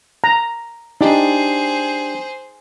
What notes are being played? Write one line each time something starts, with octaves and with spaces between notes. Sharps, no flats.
A#5
D4 D#4 G4 G#4 C5